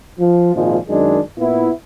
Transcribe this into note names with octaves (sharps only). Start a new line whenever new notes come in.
F3
G#1 A#2 F3 G#3
F#2 D#3 G#3 D4
A#2 B3 E4